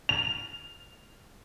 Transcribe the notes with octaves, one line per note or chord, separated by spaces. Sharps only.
F7